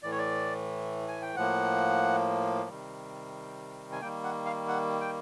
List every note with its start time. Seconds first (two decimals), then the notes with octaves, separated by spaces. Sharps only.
0.03 A2 E3 A3 D5
0.11 C#5
0.18 D5
1.08 G#5
1.22 G5
1.36 A2 F3 A#3 F#5
2.69 C3 D#3 G3
3.92 G#5
4.01 D#3 G3 A#3 G5
4.24 F#5
4.45 F5
4.68 F#5
5.01 G5